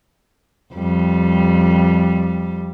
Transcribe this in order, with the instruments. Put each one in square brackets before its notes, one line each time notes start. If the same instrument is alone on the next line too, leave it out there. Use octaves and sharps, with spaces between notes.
[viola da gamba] F2 G3